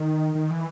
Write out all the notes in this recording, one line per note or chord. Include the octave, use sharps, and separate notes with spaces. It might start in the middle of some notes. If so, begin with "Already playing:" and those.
Already playing: D#3
D#3
E3